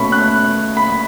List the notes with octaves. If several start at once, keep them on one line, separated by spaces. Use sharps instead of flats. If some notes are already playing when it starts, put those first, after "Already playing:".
Already playing: B2 A3 C#4 B5 C#6
F#6
B5